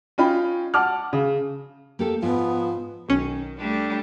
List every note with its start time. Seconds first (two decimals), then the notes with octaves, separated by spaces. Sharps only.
0.18 C#4 D#4 F4 G5 B5
0.74 F#5 A5 D6 F6
1.13 C#3
1.99 A#3 G4 A4
2.22 G#2 F3 B3
3.09 B1 D#3 C#4
3.59 G3 A3 D4